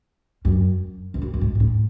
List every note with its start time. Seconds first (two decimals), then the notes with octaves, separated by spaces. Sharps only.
0.45 F#2
1.14 E2
1.22 F#2
1.34 F#2
1.41 G#2
1.55 G#2
1.60 A2